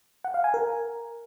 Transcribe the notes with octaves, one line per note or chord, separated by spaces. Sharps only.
F#5
F5
G#5
A#4